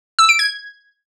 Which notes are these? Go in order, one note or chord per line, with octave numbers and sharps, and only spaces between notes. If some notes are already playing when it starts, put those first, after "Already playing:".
E6
D7
G#6